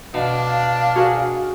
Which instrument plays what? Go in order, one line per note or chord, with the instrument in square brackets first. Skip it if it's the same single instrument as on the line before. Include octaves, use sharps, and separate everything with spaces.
[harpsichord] B2 [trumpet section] D4 [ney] F5
[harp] F#4 G#4 A#4